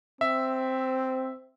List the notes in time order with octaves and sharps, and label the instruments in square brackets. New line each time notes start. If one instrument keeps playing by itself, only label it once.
[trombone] C4 [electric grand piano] E5